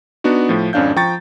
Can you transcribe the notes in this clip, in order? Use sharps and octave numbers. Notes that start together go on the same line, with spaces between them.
B3 D4 D#4 F#4
A2 F3
G#1 F2 C#4 D4 F5 G6
F3 G5 A#5 C#6 A6